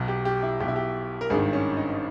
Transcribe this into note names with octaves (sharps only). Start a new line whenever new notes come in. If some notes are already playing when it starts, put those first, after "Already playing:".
Already playing: B1 B2
G4
G4
E4
B1 B2 G4
E4
G4
A#4
G#1 G2 D#3 G#4
C#4
D#4